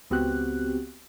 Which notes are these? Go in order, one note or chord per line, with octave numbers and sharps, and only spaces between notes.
C#2 B3 C4 F#4 G4 F#6